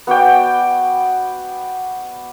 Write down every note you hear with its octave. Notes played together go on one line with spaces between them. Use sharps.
B3 F#4 D5 G5